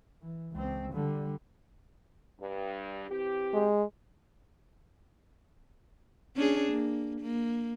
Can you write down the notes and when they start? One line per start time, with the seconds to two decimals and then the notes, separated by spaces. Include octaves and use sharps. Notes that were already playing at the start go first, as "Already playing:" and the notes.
0.22 E3
0.52 C#2 C4
0.93 D3 G3
2.39 G2
3.09 E3 C4 G4
3.54 G#3
6.36 C#4 D4 G#4
6.72 A#3
7.21 A#3